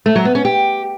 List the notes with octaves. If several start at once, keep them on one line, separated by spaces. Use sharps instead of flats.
A3
F#3
B3
C#4
G4